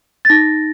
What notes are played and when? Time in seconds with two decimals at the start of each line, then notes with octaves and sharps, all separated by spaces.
0.25 A6
0.29 D#4 A#6